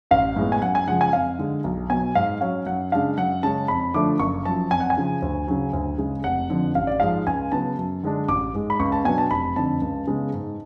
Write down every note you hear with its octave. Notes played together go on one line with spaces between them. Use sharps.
A1 F5
A2 G#3 B3
G#5
F#2 F#5
G#5
C#3 F3 G#3 F#5
G#5
F2 F5
D3 G#3
B1
B2 F#3 G#5
G#2 F5
F#3 C#4 F5
F#2 F#5
C#3 G#3 D4 F5
F#2 F#5
C#3 G#3 C#4 A5
F2 B5
D3 F3 A3 D4 D6
F#1 C#6
F#2 F3 A5
F2 G#5
F#5
G#5
C#3 F3
D2
C#3 F#3
D2
C#3 G#3
F1 F#5
F2 D3 F3
A1 F5
D5
G#2 F3 G#3 F5
C#2 G#5
C#3 F#3 B3 A5
F#2
D3 G#3 D4
A1 D6
G#2 G#3
B5
C#2 C#6
A5
B2 F#3 B3 D4 G#5
A5
F1 B5
F2 D3 A5
C#2
C#3 G#3 B3
G#2